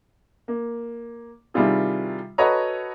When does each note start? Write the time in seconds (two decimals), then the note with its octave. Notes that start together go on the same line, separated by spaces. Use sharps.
0.48 A#3
1.54 C3 D#3 G3 E4 F4 G#4
2.38 F#4 A4 B4 C#5 D#5 A#5